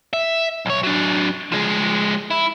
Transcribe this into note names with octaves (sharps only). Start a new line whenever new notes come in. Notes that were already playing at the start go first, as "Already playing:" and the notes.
E5
B1 C#5
F#3 D4
F3 G#3
E4